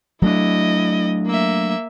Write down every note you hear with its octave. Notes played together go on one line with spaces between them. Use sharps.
F#3 A3 D4 E4 D#5
A#3 E5